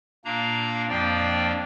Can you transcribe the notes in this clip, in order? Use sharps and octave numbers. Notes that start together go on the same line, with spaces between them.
A#2 A#3 D4 F5 A#5
F2 F3 A#3 D4 D5 G5